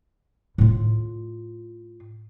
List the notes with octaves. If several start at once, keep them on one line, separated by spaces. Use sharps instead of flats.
A2 F4